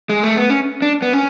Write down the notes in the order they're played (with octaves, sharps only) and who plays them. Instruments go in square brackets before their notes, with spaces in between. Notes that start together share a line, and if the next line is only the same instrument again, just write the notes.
[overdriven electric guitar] G#3
A3
B3
C#4
D4
B3
C#4